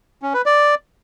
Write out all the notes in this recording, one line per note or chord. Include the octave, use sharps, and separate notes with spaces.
C#4
B4
D5